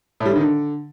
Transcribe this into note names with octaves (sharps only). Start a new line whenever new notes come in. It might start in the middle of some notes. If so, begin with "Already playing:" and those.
A2
G3
D3
D#3
D3